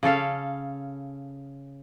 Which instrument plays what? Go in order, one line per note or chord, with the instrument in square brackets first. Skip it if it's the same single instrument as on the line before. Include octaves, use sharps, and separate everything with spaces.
[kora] C#3 C#4 A4 F5